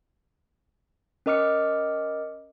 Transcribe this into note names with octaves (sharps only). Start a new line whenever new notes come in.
C#4 A#4 D#5 D6 F6 C#7